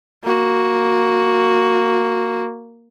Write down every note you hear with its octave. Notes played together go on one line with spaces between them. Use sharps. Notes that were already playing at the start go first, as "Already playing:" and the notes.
A#3 F#4